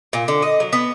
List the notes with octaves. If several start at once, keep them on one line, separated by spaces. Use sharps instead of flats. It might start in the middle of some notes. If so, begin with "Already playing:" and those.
A#2
D3
D#5
F#3
B3